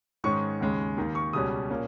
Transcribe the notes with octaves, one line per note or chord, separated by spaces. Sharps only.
G#2 D#3 G#3 C#4 C#6
D#2 C#3 G#3 C#4
D#2 D#3 A#3
C#6
C#2 B2 G3 C#4 D#6
A#2 A#3 C#4